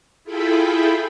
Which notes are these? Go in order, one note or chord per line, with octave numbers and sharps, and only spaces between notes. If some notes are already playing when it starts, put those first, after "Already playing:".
E4 F4 G#4 A4 G5 B5